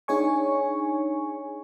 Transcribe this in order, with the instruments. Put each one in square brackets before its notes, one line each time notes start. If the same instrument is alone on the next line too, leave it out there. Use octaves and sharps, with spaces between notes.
[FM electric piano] D4 D#4 G#4 C#5 G#5 C#6